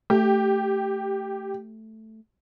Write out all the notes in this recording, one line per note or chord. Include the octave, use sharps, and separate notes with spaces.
A3 G4